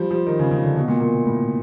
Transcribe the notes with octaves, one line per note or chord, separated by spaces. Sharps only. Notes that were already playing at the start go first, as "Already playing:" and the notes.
Already playing: F3 G3
F3
D#3
C#3
C#3
D3
B2
A#2
A#2
A2